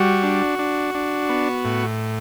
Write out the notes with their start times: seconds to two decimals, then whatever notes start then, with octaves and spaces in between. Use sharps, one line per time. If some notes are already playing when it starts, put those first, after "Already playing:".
Already playing: G3 F#4
0.23 D4
0.59 D4
0.94 D4
1.29 B3
1.65 A2